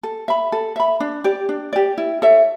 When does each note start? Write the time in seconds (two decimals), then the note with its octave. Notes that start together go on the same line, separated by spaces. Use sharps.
0.03 A4
0.28 E5 B5
0.52 A4
0.76 E5 B5
1.00 D4
1.24 G4 D5
1.49 D4
1.73 G4 D5
1.98 E4
2.22 A4 C#5 E5